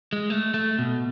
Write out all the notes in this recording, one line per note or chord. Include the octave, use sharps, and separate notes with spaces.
G#3
A3
A3
B2